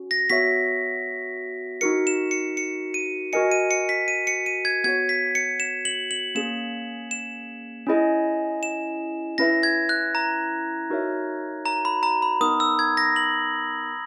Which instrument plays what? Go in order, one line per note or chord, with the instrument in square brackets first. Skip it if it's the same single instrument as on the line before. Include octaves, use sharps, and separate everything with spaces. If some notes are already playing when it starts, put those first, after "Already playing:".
Already playing: [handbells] C#4 F#4
[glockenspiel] A#6
[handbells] B3 F#4 C#5 E5 [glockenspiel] B6
[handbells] D#4 F#4 A#4 [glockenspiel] C#7
[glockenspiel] E7
C#7
C#7
D#7
[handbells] F#4 A#4 D#5 G#5 [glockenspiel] C#7
[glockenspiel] D#7
C#7
B6
D#7
C#7
D#7
G#6
[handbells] B3 F#4 C#5 [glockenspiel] G#6
[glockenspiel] B6
C#7
E7
F#7
F#7
[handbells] A#3 C#4 G#4 [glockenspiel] E7
[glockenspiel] E7
[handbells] C#4 E4 G#4 D#5 G#5
[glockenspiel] E7
[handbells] C#4 E4 B4 E5 [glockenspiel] A#6
[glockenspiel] G#6
F#6
A#5
[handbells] D#4 F#4 A#4 C#5 E5
[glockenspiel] A#5
B5
A#5
B5
[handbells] B3 D#4 A#4 [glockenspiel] D#6
[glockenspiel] E6
G#6
A#6
F#7